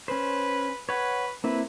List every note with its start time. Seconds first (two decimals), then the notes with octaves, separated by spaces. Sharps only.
0.08 C#4 B4 C5
0.89 B4 C#5 F#5
1.44 A#3 C4 E4 B4